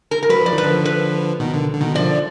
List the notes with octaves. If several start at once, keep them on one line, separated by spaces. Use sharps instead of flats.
A#4
A#4
F#3 B4
F3 D5
D#3
B4
D3 F3
B4
B2 D#3
D3
D3
B2 D#3
D3 F3 D5